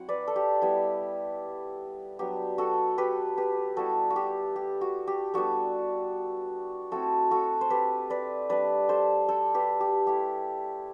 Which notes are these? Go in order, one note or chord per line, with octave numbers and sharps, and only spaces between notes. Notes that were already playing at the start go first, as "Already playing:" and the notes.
Already playing: F#3 C4 E4 F#5
B4 D5
A4
G4
G3 B3 E4
F#3 B3 D4 G4
F#4 A4
G4 B4
G4 B4
G3 B3 E4 F#4 A4
F#4
G4
G4
F#4
G4
G3 B3 D4 F#4 A4
A3 C4 E4 F#4 A4
F#4 A4
C5
G4 B4
B4 D5
G3 D4 B4 D5
A4 C5
A4 C5
G4 B4
G4
A3 E4 G4